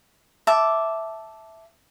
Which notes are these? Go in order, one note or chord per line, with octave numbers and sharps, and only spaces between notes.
E5 A5 D6